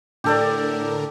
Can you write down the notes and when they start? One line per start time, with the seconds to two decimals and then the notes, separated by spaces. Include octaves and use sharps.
0.24 A2 D3 G4 A4 A#4 D5